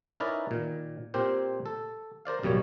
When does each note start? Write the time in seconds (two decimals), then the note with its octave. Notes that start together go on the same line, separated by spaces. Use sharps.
0.20 C#4 D#4 E4 A#4 B4 D5
0.51 A#2 D#3
1.14 A#2 C4 G4 A#4 C5
1.66 A4
2.25 A#4 C5 D5 F5
2.43 A1 F#2 B2 G3 A#3 C#5